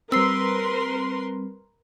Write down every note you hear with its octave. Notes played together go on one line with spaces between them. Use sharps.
G3 C4 A#4 B4 C6 E6 C7